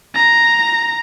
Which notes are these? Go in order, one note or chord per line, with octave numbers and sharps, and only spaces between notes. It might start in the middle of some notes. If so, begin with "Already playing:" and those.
A#5